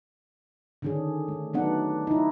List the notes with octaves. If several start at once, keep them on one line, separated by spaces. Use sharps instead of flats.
D3 D#3 C#4 D4 G#4
A3
F#3 A3 B3 D4 D#4 F#5
D#4 E4